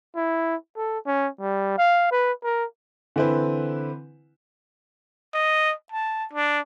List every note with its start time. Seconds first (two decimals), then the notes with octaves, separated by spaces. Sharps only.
0.16 E4
0.77 A4
1.06 C#4
1.41 G3
1.78 F5
2.11 B4
2.44 A#4
3.16 D3 E3 C4 E4 B4
5.34 D#5
5.92 A5
6.33 D4